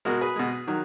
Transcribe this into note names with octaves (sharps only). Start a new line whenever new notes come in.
B2 G#3 F#4 A#4
G#4 B4
B2 G#3
D#3 F#3